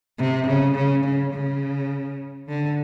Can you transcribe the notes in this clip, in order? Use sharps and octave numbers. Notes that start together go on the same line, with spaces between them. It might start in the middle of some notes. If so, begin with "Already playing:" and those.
C3
C#3
C#3
C#3
C#3
D3